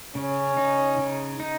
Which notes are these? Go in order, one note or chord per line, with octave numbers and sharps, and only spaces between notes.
C#3 C#4
D#4
C#3
D#4